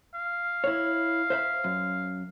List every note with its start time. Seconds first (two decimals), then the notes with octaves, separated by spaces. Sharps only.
0.14 F5
0.64 E4 C#5
1.30 C5 E5 B5
1.64 F#2